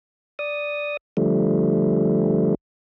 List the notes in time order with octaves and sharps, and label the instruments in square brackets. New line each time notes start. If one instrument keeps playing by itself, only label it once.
[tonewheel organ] D5 D#6
D3 F3 G3 A3